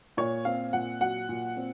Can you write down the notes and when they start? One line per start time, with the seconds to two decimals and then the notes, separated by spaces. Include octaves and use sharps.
0.17 A#2 C#5
0.45 C4 F5
0.73 A#2 F#5
1.01 F#3 F#5
1.29 A#2
1.57 C4